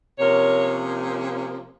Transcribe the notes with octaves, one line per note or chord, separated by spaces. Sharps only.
C3 F3 A#3 C#4 A#4 C#5